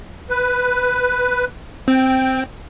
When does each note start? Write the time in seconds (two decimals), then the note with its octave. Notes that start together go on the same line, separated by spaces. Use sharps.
0.29 B4
1.88 C4 G5